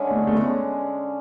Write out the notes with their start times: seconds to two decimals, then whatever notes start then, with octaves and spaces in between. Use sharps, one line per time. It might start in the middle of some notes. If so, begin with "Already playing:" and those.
Already playing: D3 G#3 C#4
0.11 A3
0.27 A3
0.36 D3 G#3 B3 C#4